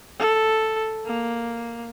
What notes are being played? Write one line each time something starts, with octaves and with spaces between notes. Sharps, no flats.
A4
A#3